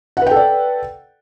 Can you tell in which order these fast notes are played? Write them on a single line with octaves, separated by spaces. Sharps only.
F#5 B4 G5 A4 D5